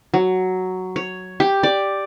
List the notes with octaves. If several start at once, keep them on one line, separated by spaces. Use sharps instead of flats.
F#3
C#5
G4
D5